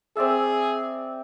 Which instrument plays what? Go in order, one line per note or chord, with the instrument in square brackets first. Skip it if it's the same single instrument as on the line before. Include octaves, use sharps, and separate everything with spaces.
[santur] C4 D5 E5 [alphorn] G#4